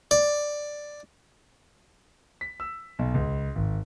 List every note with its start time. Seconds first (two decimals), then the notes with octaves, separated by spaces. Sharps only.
0.11 D5
2.41 B6
2.60 E6
2.99 B1
3.14 C#2
3.55 G#1